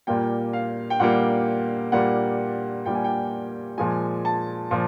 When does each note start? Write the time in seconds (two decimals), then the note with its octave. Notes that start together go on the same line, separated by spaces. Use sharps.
0.07 A#2 G3 A#3 G5
0.53 F5
0.90 G5
1.00 A#2 G3 A#3 F#5
1.92 A#2 G3 A#3 F#5
2.86 A#2 G3 A#3 G5
2.95 G#5
3.04 G5
3.78 A#2 F3 G#3 G#5
4.25 A5
4.71 A#2 F3